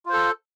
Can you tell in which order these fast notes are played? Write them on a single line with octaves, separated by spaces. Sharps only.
F4 C5 A4